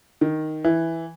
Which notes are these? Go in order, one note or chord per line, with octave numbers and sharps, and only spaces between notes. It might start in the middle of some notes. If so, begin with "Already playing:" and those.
D#3
E3